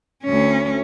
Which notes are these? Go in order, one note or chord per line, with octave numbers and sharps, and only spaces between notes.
D2 C#4